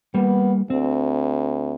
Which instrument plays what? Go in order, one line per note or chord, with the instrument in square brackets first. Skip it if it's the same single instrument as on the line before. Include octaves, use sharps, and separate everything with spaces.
[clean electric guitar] G3 A#3 [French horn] B3
[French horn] D2 [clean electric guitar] C4